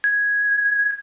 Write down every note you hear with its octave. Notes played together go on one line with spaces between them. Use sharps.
G#6